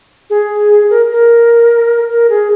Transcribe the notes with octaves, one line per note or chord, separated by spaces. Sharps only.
G#4
A#4
A#4
A#4
G#4